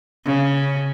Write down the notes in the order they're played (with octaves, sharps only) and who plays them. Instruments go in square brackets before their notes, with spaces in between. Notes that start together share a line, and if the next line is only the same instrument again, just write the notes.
[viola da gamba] C#3